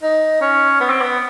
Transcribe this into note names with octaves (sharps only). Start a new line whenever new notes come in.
D#4
C#4
B3
C4
B3